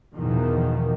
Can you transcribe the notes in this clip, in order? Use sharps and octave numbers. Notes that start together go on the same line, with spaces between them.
E2 B2 D#3 F3